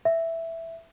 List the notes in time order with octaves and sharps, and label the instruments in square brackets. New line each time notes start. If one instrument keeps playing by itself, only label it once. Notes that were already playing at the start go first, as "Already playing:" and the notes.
[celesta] E5